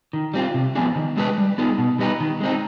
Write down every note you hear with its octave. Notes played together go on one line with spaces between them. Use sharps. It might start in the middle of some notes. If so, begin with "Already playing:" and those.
D#3
G3 C4 F4
C3
F3 B3 D4 G#4
D#3
G#3 D4 G#4 B4
G3
B3 D#4 G#4
B2
G3 B3 D#4 B4
D#3
G#3 C4 D#4